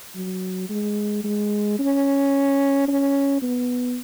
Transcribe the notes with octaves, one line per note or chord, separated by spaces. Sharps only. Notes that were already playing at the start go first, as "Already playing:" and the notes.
F#3
G#3
G#3
C#4
C#4
B3